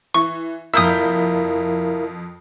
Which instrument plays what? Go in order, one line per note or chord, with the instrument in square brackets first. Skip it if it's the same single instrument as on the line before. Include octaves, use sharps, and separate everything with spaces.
[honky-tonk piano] E3 [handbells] C#6
[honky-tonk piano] F2 G6 B6 [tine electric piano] E4 A#4 F5 [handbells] D#6 E6